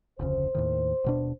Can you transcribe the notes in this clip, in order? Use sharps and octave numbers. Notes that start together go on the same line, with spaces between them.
F1 D2 C#3 C5
D#2 A2 D#3
D#1 B2 D4